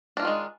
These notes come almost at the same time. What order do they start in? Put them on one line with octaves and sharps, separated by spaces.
D4 A#3 F4 D#3 G#3